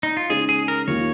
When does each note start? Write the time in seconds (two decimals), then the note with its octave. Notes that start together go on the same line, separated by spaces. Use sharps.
0.03 D#4
0.17 F4
0.29 C#3 G#3 D#4 G#4
0.49 G#4
0.68 A#4
0.87 D#2 D#3 A#3 F4 C#5